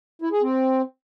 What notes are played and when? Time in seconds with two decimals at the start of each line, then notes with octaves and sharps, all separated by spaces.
0.22 E4
0.32 G#4
0.42 C4